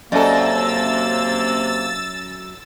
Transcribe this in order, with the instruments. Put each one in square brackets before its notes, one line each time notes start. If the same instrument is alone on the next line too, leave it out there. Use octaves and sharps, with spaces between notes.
[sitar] F#2 A4 [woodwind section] C3 A#3 [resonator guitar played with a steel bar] D5 D#5 [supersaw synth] E6 A6